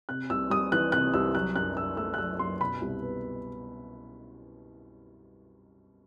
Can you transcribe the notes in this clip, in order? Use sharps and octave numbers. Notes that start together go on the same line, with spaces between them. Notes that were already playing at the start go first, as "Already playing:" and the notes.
C3 F#6
C2 E6
G3 D#6
E3 F#6
C3 F#6
C2 E6
F#3 F#6
F#2 F#6
F#2 E6
A3 E6
F#6
F#3 E6
F#2 C6
B2 B5
C2
B3